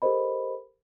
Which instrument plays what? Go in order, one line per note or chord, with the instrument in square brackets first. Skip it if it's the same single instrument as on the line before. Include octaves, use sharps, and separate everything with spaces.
[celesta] G4 A4 A#4 C5 D#5 B5